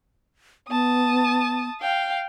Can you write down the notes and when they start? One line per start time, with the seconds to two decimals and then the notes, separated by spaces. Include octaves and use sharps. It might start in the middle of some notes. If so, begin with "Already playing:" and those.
0.70 B3 A5 D#6
1.81 F5 G5